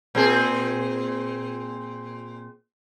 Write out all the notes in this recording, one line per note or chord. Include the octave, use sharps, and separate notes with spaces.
A#2 C4 G#4